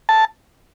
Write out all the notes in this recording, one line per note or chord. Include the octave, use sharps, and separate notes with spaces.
A5